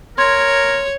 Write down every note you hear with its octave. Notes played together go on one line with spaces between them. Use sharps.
A#4 C#5 C6 G#6